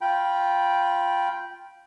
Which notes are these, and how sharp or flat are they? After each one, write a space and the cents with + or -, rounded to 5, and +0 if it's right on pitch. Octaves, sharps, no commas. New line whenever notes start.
F4 +0 G5 +0 B5 -25